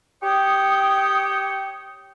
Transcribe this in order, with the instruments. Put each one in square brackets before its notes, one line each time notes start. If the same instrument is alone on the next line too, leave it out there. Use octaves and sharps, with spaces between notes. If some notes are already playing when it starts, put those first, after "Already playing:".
[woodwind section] G4 C#5 G5 C#6 D#6